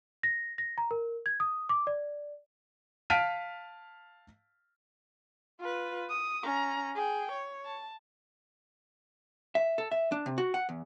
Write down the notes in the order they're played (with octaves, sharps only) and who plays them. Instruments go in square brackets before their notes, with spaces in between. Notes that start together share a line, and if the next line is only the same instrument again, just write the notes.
[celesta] A#6
A#6
A#5
A#4
G#6
D#6
D6
D5
[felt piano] F5 A5 F6 B6 D7 D#7
[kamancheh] F4 B4
D#6
C#4 A#5
G#4 G5
C#5
A5
[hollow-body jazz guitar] E5
A4
E5
D4
C3
F#4
F#5
E2